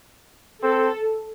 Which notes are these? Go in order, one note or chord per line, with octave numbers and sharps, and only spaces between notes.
C4 A4